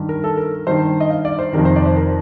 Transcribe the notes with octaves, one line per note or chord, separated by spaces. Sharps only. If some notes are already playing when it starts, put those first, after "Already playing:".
Already playing: G2 D#3
A#4
A4
A#4
G2 D#3 C5
D#5
F5
D5
C5
F2 C3 D#3 A#4
C5
D5
C5
A#4